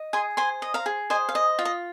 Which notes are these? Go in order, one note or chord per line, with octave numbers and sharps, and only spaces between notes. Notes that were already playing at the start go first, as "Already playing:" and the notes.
Already playing: D#5
G#4 G#5 C6
C5 G#5 C6
D#5
F5 A#5
G#4
C5 D#5 G#5
F5
D#5
F4
D#5